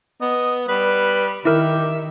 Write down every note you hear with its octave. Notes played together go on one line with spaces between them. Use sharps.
B3 D#5
G3 B4
D#3 E4 G4 A#4 E5